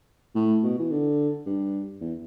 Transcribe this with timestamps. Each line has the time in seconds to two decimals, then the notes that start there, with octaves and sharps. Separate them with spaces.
0.35 A2
0.63 B2
0.79 E3
0.91 D3
1.46 G2
2.01 E2